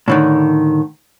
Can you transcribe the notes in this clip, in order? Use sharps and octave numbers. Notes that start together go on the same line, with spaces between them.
A2 D3 D#3